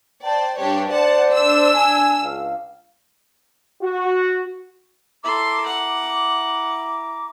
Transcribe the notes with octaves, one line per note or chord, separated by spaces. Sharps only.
C5 D5 G5 A5
G2 D4 G4 C#5
C5 D5 F#5 A5
D4 E6
G#5
C#2 F5
F#4
E4 A4 A#5 C6 D6
F#5